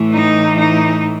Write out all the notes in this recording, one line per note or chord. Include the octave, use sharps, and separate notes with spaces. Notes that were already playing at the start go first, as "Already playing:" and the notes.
Already playing: A2 E3
D#4
D#4